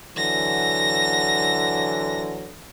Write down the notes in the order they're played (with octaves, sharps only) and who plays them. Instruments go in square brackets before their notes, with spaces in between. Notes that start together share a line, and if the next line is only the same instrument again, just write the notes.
[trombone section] D3 E3 F#3 [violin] A#6